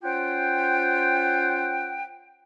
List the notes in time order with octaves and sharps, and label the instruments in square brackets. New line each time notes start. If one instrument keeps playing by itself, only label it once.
[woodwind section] C#4 F4 C5 F#5 G5